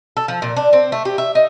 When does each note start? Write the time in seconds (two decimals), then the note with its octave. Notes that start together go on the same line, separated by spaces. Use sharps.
0.17 A4
0.28 F3
0.42 A#2
0.56 D4
0.73 C4
0.92 A3
1.05 G4
1.18 E5
1.35 D#4